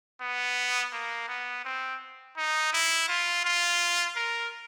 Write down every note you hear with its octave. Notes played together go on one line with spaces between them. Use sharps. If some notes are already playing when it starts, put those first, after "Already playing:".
B3
A#3
B3
C4
D#4
E4
F4
F4
A#4